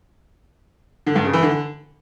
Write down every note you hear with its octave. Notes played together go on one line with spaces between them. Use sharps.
D3
G2
C#3
E3
D3